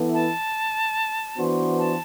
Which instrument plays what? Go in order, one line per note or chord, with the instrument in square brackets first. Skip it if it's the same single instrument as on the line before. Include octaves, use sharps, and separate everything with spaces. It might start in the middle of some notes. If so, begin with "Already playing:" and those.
Already playing: [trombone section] E3 B3 E4 A4
[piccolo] A5
[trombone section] E3 B3 D4 F#4 C5
[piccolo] A5